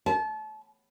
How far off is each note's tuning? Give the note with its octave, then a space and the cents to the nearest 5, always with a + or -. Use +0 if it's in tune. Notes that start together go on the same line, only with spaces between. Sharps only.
A5 -30